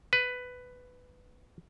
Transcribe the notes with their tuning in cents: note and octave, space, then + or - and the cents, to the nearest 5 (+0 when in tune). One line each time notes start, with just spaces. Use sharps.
B4 +10